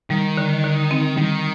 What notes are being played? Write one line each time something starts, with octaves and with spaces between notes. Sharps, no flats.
D#3 G3
D3
D3
C4
D#3 G3